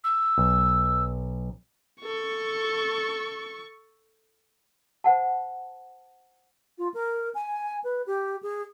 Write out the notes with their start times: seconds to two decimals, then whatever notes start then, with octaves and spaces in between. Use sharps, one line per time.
0.04 E6
0.38 B1
2.01 A4 C#6
5.04 C5 F#5 A5
6.78 F4
6.94 A#4
7.35 G#5
7.84 B4
8.07 G4
8.43 G#4